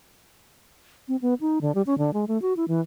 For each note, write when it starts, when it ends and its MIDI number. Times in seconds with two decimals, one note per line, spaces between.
1.08 1.16 60
1.22 1.34 59
1.41 1.59 63
1.61 1.74 50
1.75 1.82 55
1.86 1.97 61
1.98 2.11 50
2.13 2.25 56
2.28 2.40 57
2.42 2.53 66
2.57 2.65 64
2.68 2.80 52